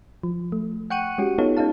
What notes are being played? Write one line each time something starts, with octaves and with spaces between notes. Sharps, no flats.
F3
A3
F#5 G5 C#6 F#6 C#7 D#7
G#3 C#4 F#4 G4
B3 D#4 F4 A4 C#5
C#4 D#4 A4 F5 A5